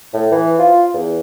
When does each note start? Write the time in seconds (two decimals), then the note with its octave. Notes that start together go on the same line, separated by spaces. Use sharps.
0.14 A2
0.32 E3
0.59 F4
0.94 E2